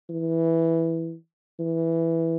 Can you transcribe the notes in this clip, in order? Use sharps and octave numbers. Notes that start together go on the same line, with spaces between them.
E3
E3